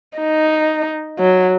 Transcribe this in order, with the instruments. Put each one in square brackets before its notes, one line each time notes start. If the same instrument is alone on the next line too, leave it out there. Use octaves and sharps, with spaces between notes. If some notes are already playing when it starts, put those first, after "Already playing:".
[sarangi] D#4
F#3